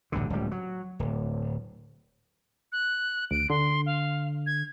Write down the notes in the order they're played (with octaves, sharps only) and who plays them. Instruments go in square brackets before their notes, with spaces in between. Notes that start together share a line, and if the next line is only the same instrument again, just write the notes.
[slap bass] A1 D2 G2 D3
D1 C#2 G3
F#3
D1
[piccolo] F#6
[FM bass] D2 [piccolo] D7
[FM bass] D3 [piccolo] C6
[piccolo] F5
G#6